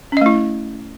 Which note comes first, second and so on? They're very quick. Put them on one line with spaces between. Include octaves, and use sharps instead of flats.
C#4 D#5 A3 E4